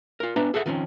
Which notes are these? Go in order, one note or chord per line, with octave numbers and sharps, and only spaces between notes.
F4 A#4
B3 D4 E5 A#5
G#4 A4 E5 F#5
D#3 F3 C4 C#4